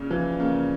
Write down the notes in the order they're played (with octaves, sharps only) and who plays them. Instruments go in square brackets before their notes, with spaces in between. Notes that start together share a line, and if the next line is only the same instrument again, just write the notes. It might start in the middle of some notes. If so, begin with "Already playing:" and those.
Already playing: [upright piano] A#2 C#3
[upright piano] E3 [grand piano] F3
[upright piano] C#3 [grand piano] A#3